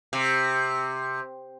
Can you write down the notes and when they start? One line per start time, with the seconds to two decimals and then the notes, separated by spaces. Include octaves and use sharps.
0.13 C3